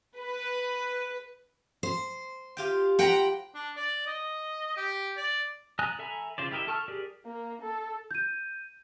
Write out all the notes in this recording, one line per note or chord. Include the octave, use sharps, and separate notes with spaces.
B4
C5
F4 G4 G5
C5 F#5 G5 A#5 B5
D4
D5
D#5
G4
D5
D5 G#5 A#5 D#6 F#6
A4 E5 G#5 A#5 B5
C#3 F4 C5 D5
E4 G4 A#4 D#5 E5
A4 A5 C#6 E6 F6
G4 G#4 A#4 D5
A#3
A4
G6 D#7